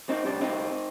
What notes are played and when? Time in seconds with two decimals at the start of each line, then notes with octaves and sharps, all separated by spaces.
0.09 C4 D#4
0.24 D2 C3 G3 C4 D4
0.41 C4 D#4